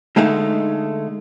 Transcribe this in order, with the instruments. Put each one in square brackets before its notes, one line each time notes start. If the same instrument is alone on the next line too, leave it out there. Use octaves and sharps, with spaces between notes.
[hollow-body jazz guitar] D3 G#3 A3 D#4 F5